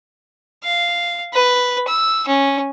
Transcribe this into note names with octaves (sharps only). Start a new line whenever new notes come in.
F5
B4
E6
C#4